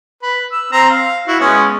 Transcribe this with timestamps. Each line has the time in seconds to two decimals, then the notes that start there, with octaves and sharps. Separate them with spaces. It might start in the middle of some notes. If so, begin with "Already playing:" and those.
0.22 B4
0.52 E6
0.72 C4 A#5
0.90 F5
1.27 E4 F#4
1.40 G#3 B3 C#4